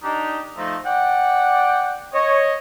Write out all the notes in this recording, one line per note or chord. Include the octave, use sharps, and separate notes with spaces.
D4 D#4 G4
F3 A3 D#4
D5 F#5 G5
C#5 D#5